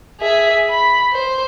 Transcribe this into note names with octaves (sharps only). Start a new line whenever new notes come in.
G#4 E5
B5
C5